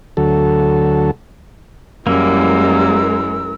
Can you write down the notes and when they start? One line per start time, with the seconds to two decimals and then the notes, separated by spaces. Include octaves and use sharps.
0.17 D2 F#3 A4
2.07 F#2 E3 G3 G#3 A#3 A#4 E6